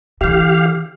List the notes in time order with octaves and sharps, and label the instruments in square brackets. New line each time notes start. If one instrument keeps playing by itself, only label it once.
[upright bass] D3 E3 [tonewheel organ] G4 F5